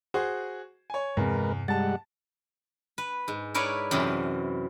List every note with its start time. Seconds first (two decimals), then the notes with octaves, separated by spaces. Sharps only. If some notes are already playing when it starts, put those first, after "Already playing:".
0.14 F#4 G#4 C5
0.90 C#5 G#5
1.17 E2 G2 C3 G#3 C4 A#4 B4
1.68 G3 G#3 F#5 A5 A6
2.98 B4
3.28 G#2
3.54 E4 A#4 B4 C#5 D5
3.91 F#2 C3 E3